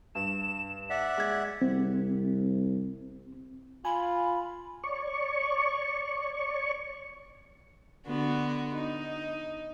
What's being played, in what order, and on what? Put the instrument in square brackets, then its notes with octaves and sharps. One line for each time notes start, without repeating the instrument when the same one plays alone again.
[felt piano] G2 [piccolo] E7
[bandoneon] D5 E5 F#5 [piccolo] B6
[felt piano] G#3 G#6
[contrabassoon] C2 [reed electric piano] C4
[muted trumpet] F4 [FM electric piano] G#5 [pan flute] B5
[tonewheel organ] C#5 D5 C#6
[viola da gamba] D3 B3 F#4
D#4